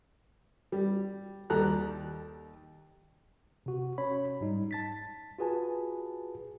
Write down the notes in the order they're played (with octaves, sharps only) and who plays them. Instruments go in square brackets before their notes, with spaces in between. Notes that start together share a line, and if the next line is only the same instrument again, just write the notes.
[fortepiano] G3
D#2 G3 G4 A4 A#5 F#6
[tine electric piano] C3 F#4
C#4 C#5 B5
G#2 G3 D#4
A5 A6 B6
F4 F#4 G#4 B4 G#5 A5